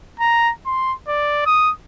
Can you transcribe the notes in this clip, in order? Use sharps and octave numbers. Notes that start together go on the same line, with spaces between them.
A#5
C6
D5
D#6